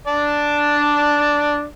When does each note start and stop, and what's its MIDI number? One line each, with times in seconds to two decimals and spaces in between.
0.07 1.64 62
0.07 1.64 74
0.07 1.64 81